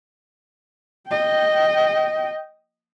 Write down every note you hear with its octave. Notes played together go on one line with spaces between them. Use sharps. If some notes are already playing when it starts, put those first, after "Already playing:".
D#5 G5